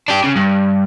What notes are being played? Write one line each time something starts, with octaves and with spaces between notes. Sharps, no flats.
D4 G4
C#3
G2